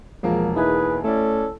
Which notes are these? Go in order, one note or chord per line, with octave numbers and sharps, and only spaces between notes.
E1 F3 G#3 A#3 A#4
D#4 E4 G#4 B4 G#5
A3 C#4 E4 A4 D5